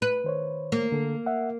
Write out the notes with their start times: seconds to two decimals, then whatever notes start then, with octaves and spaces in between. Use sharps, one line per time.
0.02 B4
0.24 D#3 C5 C#5
0.72 A#3
0.92 D3 A4
1.26 E5 F#5